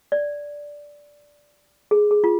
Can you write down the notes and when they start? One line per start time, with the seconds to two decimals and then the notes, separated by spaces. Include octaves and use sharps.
0.12 D5
1.91 G#4
2.11 G#4
2.24 F4